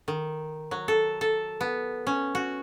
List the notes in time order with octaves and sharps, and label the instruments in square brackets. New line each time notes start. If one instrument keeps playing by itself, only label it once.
[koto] D#3
F#3
A4
A4
B3
C#4
F#4